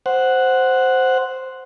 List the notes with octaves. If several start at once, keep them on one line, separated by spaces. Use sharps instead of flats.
C5 F#5